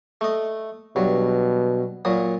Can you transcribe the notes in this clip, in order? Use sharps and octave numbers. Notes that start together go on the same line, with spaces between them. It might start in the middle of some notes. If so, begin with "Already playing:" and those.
A3 D#5
G2 B2 F#3
A#2 F#3 D#6